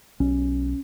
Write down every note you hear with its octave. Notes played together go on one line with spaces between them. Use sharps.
B1 C#4